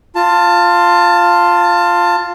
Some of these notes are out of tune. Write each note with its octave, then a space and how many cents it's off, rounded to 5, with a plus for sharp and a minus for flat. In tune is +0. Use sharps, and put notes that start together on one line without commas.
F4 +0 A5 +20